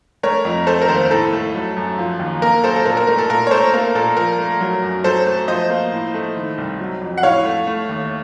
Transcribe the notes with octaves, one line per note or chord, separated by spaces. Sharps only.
A3 A#4 C#5
F2
A3 A4 C5
A#4
D#2 A4 C5
A2 A4
A3
F#3
F#2
F3
D#2
A#3 A#4
F#2 A4 C5
A4
A#2 A#4
A#4
A3 A#4
A4
A#2 A#4
C#5
A3 A4 C5
A#3 A#4
A#2 A4
F3 A#4
A3
F#3
F#2
F#3 A4 C5
A3
F3 C5 D#5
A#3
A2
A3
D#3
C2
F#3
F2
F#5
A2 C#5 F5
A3
A3
D#2